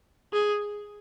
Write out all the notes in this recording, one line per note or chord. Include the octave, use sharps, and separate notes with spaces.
G#4